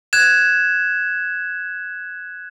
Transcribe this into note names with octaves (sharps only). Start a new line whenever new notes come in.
F#6 G#6 E7